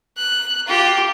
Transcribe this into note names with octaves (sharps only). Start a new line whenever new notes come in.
F#6
F4 G4